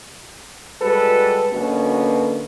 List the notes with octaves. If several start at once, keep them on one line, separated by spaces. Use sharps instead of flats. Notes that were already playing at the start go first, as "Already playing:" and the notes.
G3 G#3 F#4 A4 B4
B2 D3 F#3 A#3 B3 C#4